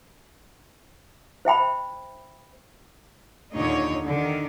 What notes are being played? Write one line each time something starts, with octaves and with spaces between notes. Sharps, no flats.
C5 E5 G5 B5
D#2 A#2 D3 D#4 C#5
D3 D#3